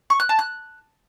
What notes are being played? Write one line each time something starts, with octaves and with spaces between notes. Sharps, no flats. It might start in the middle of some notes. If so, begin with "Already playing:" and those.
C#6
F#6
A5
F#6